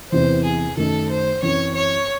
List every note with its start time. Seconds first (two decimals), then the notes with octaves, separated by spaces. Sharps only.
0.11 E2 C3 E3 C5
0.44 G#4
0.77 F#2 D#3 A3 A4
1.09 C5
1.42 F#2 E3 C4 C#5
1.75 C#5